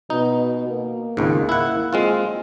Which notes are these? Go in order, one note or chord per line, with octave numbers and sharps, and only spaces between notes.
B2 D#4
A#3
G#1 C#2 G#2
E4 F#5
G#3 C4 F4